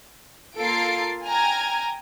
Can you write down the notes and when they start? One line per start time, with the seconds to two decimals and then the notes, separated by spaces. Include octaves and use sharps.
0.58 A#3 F4 A4 A6 C7 D7
1.24 G5 G#5 A#5 F6 G#6